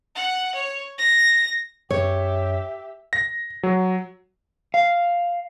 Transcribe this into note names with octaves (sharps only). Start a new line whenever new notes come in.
F#5
C#5
A#6
F#2 G4 C#5 E5
A#6
F#3
F5